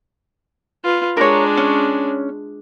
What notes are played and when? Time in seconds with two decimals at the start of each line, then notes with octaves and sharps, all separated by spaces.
0.84 F4 B4
1.17 G#3 D4 A#4 C#5
1.57 C#4